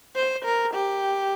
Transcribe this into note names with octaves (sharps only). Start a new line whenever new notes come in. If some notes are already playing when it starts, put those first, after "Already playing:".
C5
A#4
G4